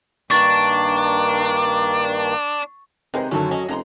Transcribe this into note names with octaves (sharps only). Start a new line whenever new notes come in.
G2 D#3 A#3 D4 C#6 A6
C3 D#3 G#3 B4 C5 A#5
F#2 D3 D#3 F#3 A3 C#4
C#4 D#5
F1 C#3 A#5 C6